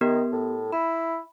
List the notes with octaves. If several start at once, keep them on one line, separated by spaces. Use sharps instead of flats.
D#3 B3 G4 A#4
A2
E4 B5